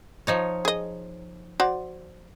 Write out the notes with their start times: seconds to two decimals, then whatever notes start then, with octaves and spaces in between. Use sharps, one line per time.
0.27 F3 D#4 C#5
0.65 G#4 D#5
1.60 F#4 C5 D5